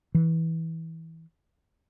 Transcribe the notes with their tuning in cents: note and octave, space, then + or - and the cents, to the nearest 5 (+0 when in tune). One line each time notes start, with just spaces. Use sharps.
E3 -20